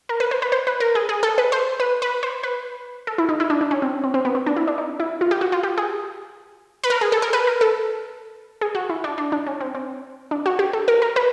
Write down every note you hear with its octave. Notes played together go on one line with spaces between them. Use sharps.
A#4
B4
C5
B4
C5
B4
A#4
G#4
G#4
A4
B4
C5
B4
B4
C5
B4
A4
E4
D#4
E4
D4
D4
C#4
C4
C4
C4
B3
C4
D4
E4
D4
D#4
E4
F4
G4
F#4
F4
G4
G#4
B4
A#4
G#4
A4
A#4
B4
A#4
A4
G#4
F#4
E4
D4
D4
D4
C#4
C4
C4
D4
F#4
G4
A4
A#4
A#4
B4